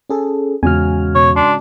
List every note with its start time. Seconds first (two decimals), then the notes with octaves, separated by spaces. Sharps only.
0.10 C#4 G#4 A4
0.63 E2 G#2 C#3 F#4 G#5 F6
1.15 B2 C#5
1.36 D4 C6